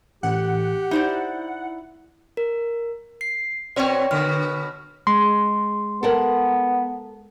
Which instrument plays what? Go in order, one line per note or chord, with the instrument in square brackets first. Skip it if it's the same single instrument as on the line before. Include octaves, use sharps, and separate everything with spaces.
[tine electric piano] A1 [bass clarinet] G4 [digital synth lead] F#5
[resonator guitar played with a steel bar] D#4 C5 D5 [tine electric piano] E4
[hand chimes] A#4
C7
[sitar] B2 C4 C#5 [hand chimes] D5 G5
[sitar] B2 D3 [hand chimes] F6
[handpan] G#3 [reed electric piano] C6
[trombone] B3 [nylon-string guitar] A4 A#4 F#5